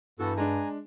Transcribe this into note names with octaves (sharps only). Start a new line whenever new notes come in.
G2 E3 B3 F#4 A4
G#3 D4 G#5 A#5